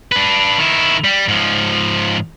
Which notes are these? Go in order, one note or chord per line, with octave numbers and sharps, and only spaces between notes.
D4 B4
D#3 E4
G3
G#2 F3